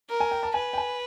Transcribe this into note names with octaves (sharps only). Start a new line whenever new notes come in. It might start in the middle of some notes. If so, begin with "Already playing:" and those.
A#4
G#5
G5
A5
B4 G#5
G5
G#5